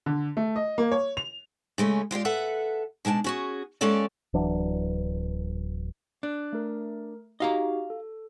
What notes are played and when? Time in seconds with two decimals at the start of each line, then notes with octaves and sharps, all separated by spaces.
0.06 D3
0.37 A3
0.56 D#5
0.78 A#3
0.92 C#5
1.17 F7
1.78 C#3 G#3 A3 C#4
2.11 G#3 F4 G4 D5
2.25 A4 B4 E5 F#5
3.05 B2 G#3 D4 G#5 A5
3.24 C#4 F#4 G#4
3.81 G#3 A#3 C#4 G4 A4 D5
4.34 D1 E3 F#3 D4
6.23 D4 F#6
6.53 A3 A#4
7.40 D#4 F#4 G4 D#5 F5 A#5
7.90 A4